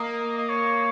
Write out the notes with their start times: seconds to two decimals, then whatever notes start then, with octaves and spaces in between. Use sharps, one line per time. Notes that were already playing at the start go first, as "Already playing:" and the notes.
Already playing: A#3 D#5
0.38 D#5
0.49 C#5